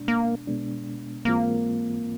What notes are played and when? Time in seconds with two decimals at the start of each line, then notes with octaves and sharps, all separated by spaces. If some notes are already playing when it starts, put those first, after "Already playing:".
Already playing: B2 G#3 B3 D4
0.08 A#3
0.47 B2 G#3 B3 D4
1.25 G#2 E3 G#3 A#3 C4 F4